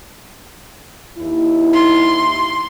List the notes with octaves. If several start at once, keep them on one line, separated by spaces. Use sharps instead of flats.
D#2 E4
C6